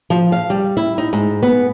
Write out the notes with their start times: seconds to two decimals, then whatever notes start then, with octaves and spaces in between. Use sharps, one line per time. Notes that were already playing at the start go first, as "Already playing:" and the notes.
0.10 F3
0.32 F5
0.50 G3
0.77 E4
0.98 D#4
1.13 G#2
1.43 B3